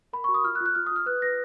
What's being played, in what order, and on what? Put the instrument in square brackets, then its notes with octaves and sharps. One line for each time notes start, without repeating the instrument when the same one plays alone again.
[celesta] A#4 B5
F#4 C#6
D#6
F4 F6
F#6
F4
F#6
F4 F6
D#6
F4 F6
B4 F#6
B4 A#6